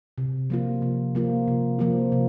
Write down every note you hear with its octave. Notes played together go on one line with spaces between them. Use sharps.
C3
F3 A#3 F4
C3
F3 A#3 F4
C3
F3 A#3 F4
C3